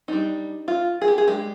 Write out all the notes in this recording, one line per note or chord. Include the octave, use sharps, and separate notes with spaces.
G3 D4 D#4
F4
G#4
G4
G#4
G#3 D4 G4